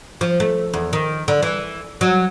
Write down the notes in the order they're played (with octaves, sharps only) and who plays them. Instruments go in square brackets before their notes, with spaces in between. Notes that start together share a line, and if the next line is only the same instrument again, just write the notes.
[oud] F3
A3
E2
D#3
D3
E3
F#3